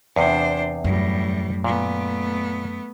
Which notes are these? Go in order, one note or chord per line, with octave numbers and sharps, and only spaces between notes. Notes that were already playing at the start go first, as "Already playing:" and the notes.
E2 C3 D4 C5
F#2 A2 G3
A#2 A3 B3